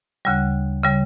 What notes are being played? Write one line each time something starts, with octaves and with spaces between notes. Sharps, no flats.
D2 C#3 G3
C#3 G3